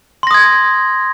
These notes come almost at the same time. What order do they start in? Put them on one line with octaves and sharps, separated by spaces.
C6 A#6 D#6 G#6